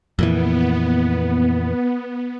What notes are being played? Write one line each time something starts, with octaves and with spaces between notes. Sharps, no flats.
F2 A#2 E3 B3